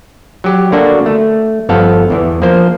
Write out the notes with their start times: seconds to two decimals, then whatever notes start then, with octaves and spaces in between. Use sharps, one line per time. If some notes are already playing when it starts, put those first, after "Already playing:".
0.44 F#3 G4
0.72 D3 A#3 D4 F#4
1.06 A3
1.69 G1 F3 B3 A4 F5
2.10 E2 E3
2.42 F3 A#3 C5